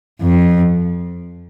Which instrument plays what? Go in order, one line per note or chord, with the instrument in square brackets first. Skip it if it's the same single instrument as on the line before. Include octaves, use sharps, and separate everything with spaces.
[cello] F2